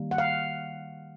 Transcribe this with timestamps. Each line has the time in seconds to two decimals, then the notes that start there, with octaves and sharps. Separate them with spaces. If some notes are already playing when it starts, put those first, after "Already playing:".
Already playing: D#3 G3 A#3
0.11 F#5
0.18 F5